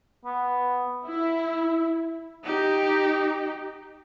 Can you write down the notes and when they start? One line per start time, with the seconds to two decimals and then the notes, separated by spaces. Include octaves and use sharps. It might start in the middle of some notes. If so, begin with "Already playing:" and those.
0.25 B3
1.05 E4
2.44 D#4 G4